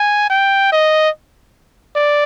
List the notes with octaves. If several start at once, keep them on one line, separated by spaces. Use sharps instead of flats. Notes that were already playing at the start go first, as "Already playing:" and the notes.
Already playing: G#5
G5
D#5
D5